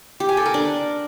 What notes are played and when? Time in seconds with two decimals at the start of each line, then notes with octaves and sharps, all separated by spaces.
0.20 G4
0.29 G#5
0.37 A4
0.46 A#4
0.54 D4